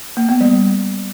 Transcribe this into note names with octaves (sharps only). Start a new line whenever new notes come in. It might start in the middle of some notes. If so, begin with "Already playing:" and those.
A#3
B3
G3